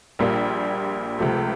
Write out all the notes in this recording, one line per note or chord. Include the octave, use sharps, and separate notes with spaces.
A#1 A#2 G3 A#3
C#2 C3 F3 A3